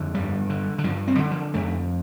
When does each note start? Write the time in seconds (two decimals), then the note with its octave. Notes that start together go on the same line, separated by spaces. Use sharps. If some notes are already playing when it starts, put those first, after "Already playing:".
Already playing: F2 D3
0.14 G2 G3
0.49 D3
0.78 D3
0.84 G2 F3
1.07 C4
1.19 D3
1.31 F3
1.54 F2 A3